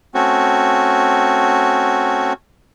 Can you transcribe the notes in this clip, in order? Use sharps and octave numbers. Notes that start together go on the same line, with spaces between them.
A3 C4 C#4 F#4